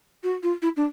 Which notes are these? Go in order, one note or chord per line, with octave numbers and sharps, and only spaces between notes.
F#4
F4
E4
D4